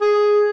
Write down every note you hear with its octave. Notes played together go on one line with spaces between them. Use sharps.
G#4